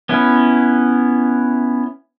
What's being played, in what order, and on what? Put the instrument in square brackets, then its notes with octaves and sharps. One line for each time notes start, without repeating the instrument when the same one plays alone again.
[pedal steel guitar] B3 C#4 E4